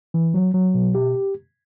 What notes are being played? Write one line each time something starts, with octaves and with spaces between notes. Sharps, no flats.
E3
F#3
F#3
B2
G4